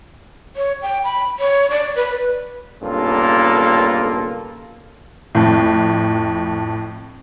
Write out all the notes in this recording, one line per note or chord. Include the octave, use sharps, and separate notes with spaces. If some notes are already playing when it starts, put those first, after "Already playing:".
C#5
G5
B5
C#5
D5
B4
B1 G2 C#3 A#3 F4 A4
F2 A2